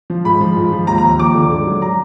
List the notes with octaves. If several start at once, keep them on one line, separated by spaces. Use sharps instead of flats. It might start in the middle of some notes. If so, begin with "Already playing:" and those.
F3
G#2 B5
F3
G#2
F3
D#2 A#5
A#5
D#2
F3 D6
D3
G#2
F#3
A#5